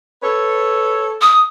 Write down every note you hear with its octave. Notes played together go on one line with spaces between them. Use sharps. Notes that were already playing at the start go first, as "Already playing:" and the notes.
A4 B4 C#5
D#6